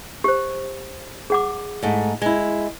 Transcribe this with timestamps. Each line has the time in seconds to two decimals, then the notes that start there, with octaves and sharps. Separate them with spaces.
0.24 G4 C5
1.30 G#4 F#5 D6
1.83 G#2 A3
2.22 G#3 E4